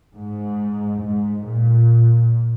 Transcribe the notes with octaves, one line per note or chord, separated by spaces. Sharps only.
G#2
G#2
A#2